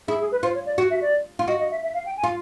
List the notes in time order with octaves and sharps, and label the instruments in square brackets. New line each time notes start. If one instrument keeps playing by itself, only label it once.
[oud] E4 [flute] G#4
[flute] G#4
B4
[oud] F4 [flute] C5
[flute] C#5
D5
[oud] F#4
[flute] E5
D5
[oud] F4
[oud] F#4 [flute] D#5
[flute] D#5
E5
E5
F5
G5
G#5
[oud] F4